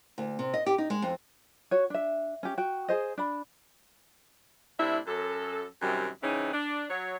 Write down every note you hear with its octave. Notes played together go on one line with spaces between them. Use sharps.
D2
C3
D#5
G4
D#4
G#3
F2
F#4 C#5
D4 E5
C#4 G4
F#4 G5
G#4 C5 D#5
D4 B5
A2 C3 D4 E4 E5
F#2 A4
F#2 C3 D#3 G3
C#3 E3 C4 C#4 D#4
D4
F#3 C#5